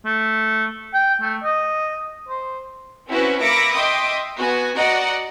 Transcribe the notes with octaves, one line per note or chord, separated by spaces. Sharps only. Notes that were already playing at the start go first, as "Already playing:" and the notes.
A3
G5
A3
D#5
C5
C4 C#4 E4 F#4 B4
A#3 E5 B5 D6 A#6 C#7
D#5 E5 G5 C6 D6 D#6
B3 F#4 G#5
F#4 D5 D#5 F#5 A#5